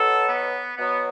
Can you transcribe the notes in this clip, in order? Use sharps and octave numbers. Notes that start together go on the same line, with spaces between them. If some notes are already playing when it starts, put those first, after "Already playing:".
Already playing: B2 F#3 A4
B3
B2 F#3 B3